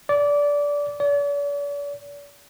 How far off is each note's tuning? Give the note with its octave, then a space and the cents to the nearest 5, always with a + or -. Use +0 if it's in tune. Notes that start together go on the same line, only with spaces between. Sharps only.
D5 -20
D5 -45